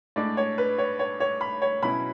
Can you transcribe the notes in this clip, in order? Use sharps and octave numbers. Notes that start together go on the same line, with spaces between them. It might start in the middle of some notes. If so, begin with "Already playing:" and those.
A2 G#3 D4 D5
C#5
B4
C#5
C#5
C#5
B5
C#5
B2 F#3 C#4 E4 B5